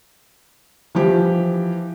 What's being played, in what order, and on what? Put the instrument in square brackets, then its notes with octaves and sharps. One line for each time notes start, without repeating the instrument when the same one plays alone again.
[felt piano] E3 F3 G4